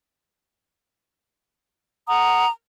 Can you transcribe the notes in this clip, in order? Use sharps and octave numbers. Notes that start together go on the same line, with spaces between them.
F#5 A#5 D#6